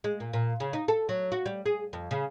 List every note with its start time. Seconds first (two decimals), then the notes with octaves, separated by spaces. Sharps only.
0.04 G#3
0.20 A#2
0.33 A#2
0.60 C#3
0.73 D#4
0.88 A4
1.09 F#3
1.32 F#4
1.46 G3
1.66 G#4
1.93 F2
2.11 C#3